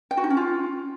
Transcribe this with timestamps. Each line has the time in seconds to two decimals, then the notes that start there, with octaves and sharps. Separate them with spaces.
0.11 G5
0.17 F#4
0.24 D#4
0.30 C#4
0.37 F4